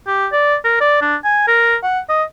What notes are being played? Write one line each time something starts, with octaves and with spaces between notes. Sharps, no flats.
G4
D5
A#4
D5
D4
G#5
A#4
F#5
D#5